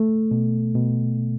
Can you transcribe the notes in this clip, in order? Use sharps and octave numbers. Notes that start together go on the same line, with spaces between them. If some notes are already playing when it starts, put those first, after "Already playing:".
Already playing: A3
B2
B2